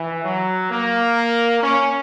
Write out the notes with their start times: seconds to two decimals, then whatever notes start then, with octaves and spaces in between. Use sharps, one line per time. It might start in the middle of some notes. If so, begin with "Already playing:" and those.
Already playing: E3
0.24 F#3
0.70 A#3
1.63 C#4